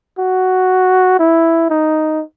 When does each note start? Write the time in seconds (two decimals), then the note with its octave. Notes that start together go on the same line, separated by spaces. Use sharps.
0.19 F#4
1.19 E4
1.70 D#4